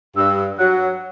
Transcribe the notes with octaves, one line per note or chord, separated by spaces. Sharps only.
G2 E6
F#3 F#6